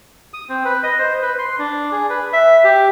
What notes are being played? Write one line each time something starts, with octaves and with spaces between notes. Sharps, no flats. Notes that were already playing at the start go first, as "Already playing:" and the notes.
D#6
C4
B4
D#5
C5
B4
C6
D4
G#4
B4
E5
G4